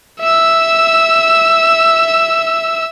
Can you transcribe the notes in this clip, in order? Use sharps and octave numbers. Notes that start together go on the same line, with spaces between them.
E5 E6